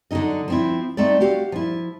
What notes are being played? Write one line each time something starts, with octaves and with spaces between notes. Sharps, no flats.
D3 F#3 G#3 D#4 D#5
F3 C4 E4
A3 C4 D#4 D5
F#4 G4 F5
F3 E4